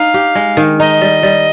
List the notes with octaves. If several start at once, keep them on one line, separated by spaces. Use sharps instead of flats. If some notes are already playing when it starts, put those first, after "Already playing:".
Already playing: D#4 F5
G4
G#3
D#3
D#4 D#5
G3
G3